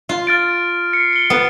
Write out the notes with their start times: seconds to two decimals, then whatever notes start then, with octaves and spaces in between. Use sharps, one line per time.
0.09 F4
0.27 F6 A6 D7
0.93 C7 C#7
1.13 C#7 G7
1.30 B3